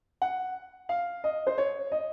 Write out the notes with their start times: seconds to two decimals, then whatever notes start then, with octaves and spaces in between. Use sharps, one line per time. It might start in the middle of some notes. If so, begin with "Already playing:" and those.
0.22 F#5
0.89 F5
1.24 D#5
1.47 C5
1.58 C#5
1.92 D#5